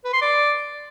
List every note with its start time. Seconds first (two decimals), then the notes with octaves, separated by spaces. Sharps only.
0.05 B4
0.13 C6
0.22 D5